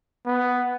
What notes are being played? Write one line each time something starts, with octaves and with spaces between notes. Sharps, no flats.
B3